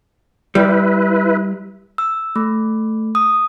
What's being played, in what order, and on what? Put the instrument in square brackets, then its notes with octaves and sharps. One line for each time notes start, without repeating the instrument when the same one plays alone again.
[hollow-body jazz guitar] G3 [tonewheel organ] E4 B4
[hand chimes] E6
A3
D#6